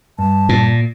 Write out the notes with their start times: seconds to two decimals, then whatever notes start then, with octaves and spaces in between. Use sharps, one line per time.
0.19 G2 A5
0.49 A#2